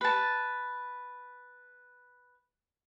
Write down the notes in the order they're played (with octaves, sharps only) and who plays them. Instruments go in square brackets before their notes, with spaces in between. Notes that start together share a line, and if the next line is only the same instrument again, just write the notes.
[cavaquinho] B4 A5